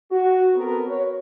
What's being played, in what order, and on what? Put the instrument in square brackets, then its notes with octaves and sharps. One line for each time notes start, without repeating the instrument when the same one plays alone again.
[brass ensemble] F#4
B3 C4 A4 A#4
F#4 A#4 B4 C#5